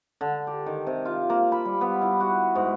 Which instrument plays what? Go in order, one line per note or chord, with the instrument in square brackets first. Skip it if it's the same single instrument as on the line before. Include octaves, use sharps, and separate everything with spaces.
[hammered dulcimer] D3
G4
D#3
C3
F4
A#3
B5
G3
B3
E4
F#4
G#2